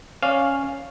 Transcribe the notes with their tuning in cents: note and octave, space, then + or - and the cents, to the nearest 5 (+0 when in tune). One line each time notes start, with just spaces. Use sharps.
C#4 -5 D5 +0 F5 +0